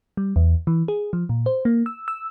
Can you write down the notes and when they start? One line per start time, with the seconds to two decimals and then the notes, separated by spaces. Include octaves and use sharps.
0.17 G3
0.36 E2
0.67 E3
0.88 G#4
1.13 F3
1.29 A#2
1.46 C5
1.65 A#3
1.86 E6
2.08 E6